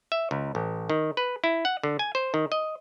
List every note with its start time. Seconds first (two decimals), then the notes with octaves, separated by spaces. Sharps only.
0.12 E5
0.31 C#2
0.55 A1
0.90 D#3
1.17 B4
1.44 E4
1.65 F#5
1.83 D3
1.99 G#5
2.15 C5
2.34 D#3
2.52 D#5